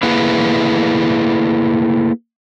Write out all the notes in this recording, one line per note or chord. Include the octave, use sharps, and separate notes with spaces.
A3 A#3 E4 G#4 B4